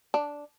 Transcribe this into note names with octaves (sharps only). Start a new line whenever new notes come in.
D4